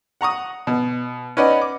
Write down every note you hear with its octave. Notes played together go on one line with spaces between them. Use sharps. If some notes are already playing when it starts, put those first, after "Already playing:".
F#5 A#5 C#6 D#6
B2
C#4 D#4 B4 D5 D#5 F#5
D6